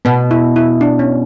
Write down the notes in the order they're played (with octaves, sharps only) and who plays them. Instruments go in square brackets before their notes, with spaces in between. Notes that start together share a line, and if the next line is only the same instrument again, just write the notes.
[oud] B2 [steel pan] B3
[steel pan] E4
E4
D4
C#4